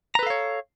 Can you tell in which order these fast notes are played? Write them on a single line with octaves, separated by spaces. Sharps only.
A#5 B4 A4 F5 C#5